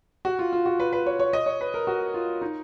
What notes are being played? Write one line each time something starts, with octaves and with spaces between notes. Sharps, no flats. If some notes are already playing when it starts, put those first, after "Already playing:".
F#4
F4
F4
F#4
B4
B4
C#5
C#5
D#5
C#5
B4
A#4
F#4
F4
D#4